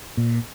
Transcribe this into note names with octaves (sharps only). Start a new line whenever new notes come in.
A#2